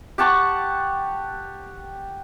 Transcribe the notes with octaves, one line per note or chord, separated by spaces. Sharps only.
G4 F#5 A5 C#6